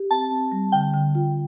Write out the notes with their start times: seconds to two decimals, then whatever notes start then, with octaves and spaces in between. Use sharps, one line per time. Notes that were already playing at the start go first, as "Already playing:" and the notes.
Already playing: G4
0.11 C4 A5
0.31 C4
0.52 G3
0.72 D3 G5
0.94 D3
1.15 F4